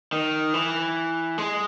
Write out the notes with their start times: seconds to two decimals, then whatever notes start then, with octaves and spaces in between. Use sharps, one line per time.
0.13 D#3
0.54 E3
1.38 G#3